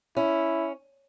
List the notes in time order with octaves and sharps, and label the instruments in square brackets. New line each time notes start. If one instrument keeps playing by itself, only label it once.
[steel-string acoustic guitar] C#4 [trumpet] E4